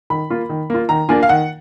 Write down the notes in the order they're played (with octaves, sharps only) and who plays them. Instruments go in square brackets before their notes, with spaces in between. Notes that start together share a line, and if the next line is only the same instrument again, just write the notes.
[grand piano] D#3 B5
A#3 F4
D#3
A#3 F4
D#3 A#5
A#3 D4 F4 G#5
F5
D#3 F#5